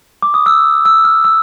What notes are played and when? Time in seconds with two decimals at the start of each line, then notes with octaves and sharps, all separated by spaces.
0.22 D6
0.34 D#6
0.46 E6
0.85 E6
1.04 F6
1.25 E6